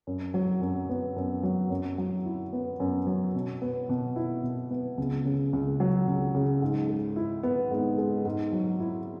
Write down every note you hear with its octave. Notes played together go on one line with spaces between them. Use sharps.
F#2
F#3
F#2
B3
F#2
F#3
F#2
F#3
E4
B3
F#2
F#3
B2
B3
B2
E4
B2
B3
C#2
C#3
C#2
F#3
C#2
C#3
G#2
G#3
E4
B3
G#2
G#3
G#2
F#3
E4